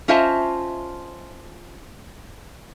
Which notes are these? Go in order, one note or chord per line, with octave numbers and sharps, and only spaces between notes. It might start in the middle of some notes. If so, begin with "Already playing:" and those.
C#4 F4 C5 D#5 E5 A5